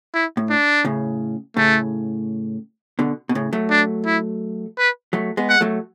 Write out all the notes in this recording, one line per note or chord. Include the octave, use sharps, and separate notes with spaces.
E4
A2
D4
A2 C#3
A2 C#3 A3
B2 D3
B2
A2 C#3
F#3 A3
D4
E4
B4
F#3 A3
G#3 B3
F#5
F#3 A3